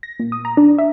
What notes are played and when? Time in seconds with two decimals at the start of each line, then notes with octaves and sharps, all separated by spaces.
0.03 A#6
0.20 A#2
0.32 D#6
0.45 A#5
0.57 D4
0.78 E5